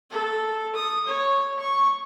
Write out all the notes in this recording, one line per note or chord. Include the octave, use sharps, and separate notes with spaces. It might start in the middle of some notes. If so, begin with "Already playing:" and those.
A4
D#6
C#5
C#6